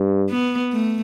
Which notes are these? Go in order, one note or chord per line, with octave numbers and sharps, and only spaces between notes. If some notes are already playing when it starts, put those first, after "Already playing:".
Already playing: G2
B3
A3